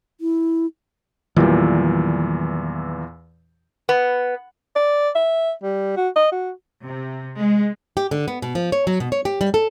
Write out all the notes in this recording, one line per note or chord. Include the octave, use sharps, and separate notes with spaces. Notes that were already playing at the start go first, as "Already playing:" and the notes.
E4
E2 A#2 D#3 E3 F#3 G3
B3
D5
E5
G3
F#4
D#5
F#4
C3
G#3
G4
D3
B3
B2
F3
C#5
F#3
B2
C#5
G4
G3
A4